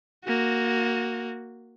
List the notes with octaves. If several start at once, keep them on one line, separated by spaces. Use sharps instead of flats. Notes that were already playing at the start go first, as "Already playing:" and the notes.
A#3 F#4